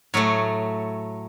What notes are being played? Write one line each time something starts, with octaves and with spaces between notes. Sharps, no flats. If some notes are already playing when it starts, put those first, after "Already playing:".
A2 F#3 A3 C#5